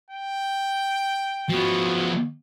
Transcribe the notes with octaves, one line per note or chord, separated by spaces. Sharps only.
G5
F3 B3 F#4